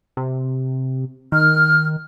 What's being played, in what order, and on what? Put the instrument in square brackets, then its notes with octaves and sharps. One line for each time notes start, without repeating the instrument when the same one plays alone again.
[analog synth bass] C3
[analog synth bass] D#3 [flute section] F6